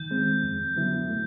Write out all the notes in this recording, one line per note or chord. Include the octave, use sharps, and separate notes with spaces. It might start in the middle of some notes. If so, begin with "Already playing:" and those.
Already playing: D#3 G6
G#3 C4
F2
D3 F#3 B3 E4
A3